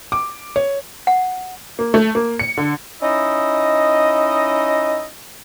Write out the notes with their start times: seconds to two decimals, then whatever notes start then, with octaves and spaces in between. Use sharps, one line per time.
0.12 D6
0.56 C#5
1.07 F#5
1.79 A#3
1.94 A3
2.15 A#3
2.39 C#7
2.57 D3
3.02 C#4 D#4 E4 D#5